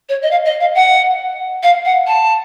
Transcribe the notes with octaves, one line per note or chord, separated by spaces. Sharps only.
C#5
D#5
F5
D#5
F5
F#5
F5
F#5
A5